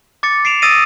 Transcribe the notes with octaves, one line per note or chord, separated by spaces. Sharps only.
D6 A6 C#7
C7 D7 E7 F7
D#6 E6 A6 A#6 D7 D#7